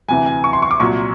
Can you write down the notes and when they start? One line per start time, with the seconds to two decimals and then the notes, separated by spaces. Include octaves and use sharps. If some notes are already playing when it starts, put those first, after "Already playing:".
0.08 D2 C3 E3 G#5
0.26 G#5
0.44 C#6
0.53 C6
0.62 C#6
0.71 D6
0.80 C2 A#2 F#3 C#6